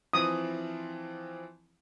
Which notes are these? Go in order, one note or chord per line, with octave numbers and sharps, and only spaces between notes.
E3 F3 C4 D#6